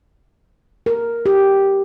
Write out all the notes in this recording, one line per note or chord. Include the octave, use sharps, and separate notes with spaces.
A#4
G4